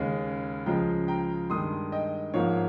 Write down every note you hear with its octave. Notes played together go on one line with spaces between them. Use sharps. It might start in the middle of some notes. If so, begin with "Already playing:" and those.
Already playing: D#2 C#3 G#3
C#2 C#3 F3 G#3 G5 A#5
G5 A#5
G2 D#3 G#3 C6 D#6
D#5 G5
G#2 F3 A#3 C#5 F5